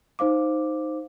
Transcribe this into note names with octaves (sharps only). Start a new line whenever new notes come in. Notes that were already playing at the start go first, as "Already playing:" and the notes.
D#4 C5 F5 D6